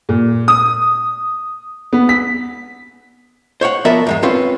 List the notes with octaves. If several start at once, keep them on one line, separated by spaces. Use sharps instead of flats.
A#2
D#6
B3
B6
C5 C#5 F5 F#5
F3 B3 A#4 D5 E5
E2 G#2 G#3
C4 C#4 F4 B4